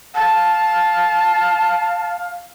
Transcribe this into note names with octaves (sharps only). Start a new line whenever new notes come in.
F5 A5